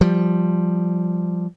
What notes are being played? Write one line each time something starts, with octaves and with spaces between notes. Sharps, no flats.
F3 G3